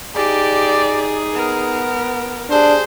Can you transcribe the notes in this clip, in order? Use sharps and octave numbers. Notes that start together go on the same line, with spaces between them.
D#4 G4 G#4 D5
B3 A#4
D4 G4 G#4 C5